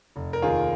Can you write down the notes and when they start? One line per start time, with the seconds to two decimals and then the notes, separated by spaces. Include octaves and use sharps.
0.16 F1
0.33 A#4
0.42 D#2 D#3 F4 G#4